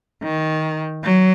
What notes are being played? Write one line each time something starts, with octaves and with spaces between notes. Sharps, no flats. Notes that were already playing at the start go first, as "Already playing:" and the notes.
D#3
F#3